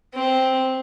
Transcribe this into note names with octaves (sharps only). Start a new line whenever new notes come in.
C4